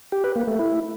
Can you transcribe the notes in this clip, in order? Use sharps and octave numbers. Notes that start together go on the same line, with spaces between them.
G4
B4
A#3
A3
E4